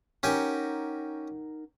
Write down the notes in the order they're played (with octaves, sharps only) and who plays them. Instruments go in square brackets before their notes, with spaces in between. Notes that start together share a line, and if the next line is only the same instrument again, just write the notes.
[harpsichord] C#4 G4 G#5 [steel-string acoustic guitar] D#4 A#4 F#5